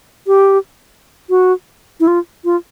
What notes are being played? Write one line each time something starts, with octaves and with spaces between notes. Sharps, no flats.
G4
F#4
E4
F4
F4